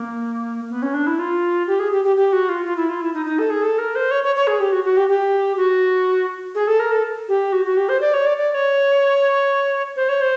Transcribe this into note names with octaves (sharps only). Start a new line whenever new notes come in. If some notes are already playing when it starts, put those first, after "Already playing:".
Already playing: A#3
B3
C#4
D4
E4
F4
G4
G#4
G4
G4
G4
F#4
F4
F4
E4
F4
E4
D#4
D#4
A4
G#4
A4
A#4
C5
C#5
C#5
C#5
G#4
G4
F#4
F#4
G4
G4
F#4
G#4
A4
A#4
A4
G4
F#4
F#4
G4
C5
D5
C#5
D5
D5
D5
C#5
C5
C#5
C5